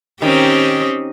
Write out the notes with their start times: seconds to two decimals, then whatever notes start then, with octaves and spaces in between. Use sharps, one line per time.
0.22 D#3 C4 C#4 G4